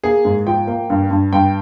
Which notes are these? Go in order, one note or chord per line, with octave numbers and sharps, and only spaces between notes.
A#3 G#4
G#2
F3 G5
A#3
G2
G2
G2 G5